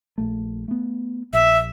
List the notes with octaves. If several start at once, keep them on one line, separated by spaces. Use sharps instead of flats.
A#1 A3
A3 B3
A#1 E5